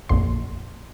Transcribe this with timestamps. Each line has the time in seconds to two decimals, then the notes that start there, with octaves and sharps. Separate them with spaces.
0.09 A#1 F2 C6